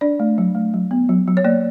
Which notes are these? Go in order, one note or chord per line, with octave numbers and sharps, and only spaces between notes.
D4 D5
A3
F#3
A3
F#3
B3
F#3
F#3
C#5
A#3 D5